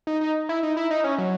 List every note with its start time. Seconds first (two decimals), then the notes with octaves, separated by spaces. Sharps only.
0.07 D#4
0.21 D#4
0.49 E4
0.63 D#4
0.77 E4
0.91 D#4
1.04 C#4
1.18 F#3